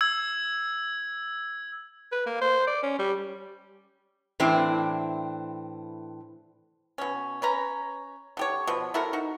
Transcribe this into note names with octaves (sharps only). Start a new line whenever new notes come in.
E6 G#6
B4
A#3
C5
D5
C#4
G3
A2 E3 C4 D4
B2 C#4
C#4 B4 A#5
D3 G4 C#5
B2 F3
E4 F#4 A4 A#4
D#4 F#4